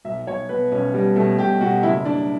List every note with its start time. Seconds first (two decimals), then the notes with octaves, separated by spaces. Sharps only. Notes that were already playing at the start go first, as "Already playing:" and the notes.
0.05 B1 E5
0.27 B1 C#5
0.49 B2 B4
0.72 B1 C#4
0.94 B2 G3
1.16 B2 A3
1.38 B2 G4
1.61 B2 F#4
1.83 F#1 E4
2.05 F#1 D4